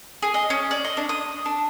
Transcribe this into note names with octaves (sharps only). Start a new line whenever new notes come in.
G#4
D#5
C#4
D5
D#5
D4
D#6
D4